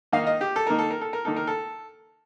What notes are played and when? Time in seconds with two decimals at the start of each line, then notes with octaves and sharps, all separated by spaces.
0.12 D#3 A#3 D#4 F5
0.27 D#5
0.41 G4
0.56 A4
0.67 D#3 A#3 D#4 A#4
0.79 A4
0.91 A#4
1.01 A4
1.13 A#4
1.25 D#3 A#3 D#4 A4
1.36 A#4
1.47 A4